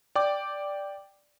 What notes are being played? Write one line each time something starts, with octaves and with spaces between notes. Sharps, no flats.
D5 G5 D6